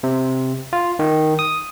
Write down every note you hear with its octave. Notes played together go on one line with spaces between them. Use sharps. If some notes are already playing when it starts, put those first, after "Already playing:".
C3
F4
D#3
D#6